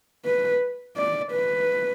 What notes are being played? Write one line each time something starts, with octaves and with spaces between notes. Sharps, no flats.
B4
D5
B4